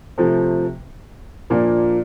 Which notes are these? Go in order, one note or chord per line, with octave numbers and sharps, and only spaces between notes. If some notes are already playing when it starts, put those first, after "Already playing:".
C3 F3 A3
A#2 F3 A#3 D4